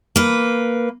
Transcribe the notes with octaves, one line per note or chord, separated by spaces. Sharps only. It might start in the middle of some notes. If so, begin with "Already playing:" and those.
A#3 B4